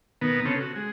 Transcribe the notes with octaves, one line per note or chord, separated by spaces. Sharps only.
B2 D#3 B3 A#4
C#3 C4 C#4 A4
F#4
G#3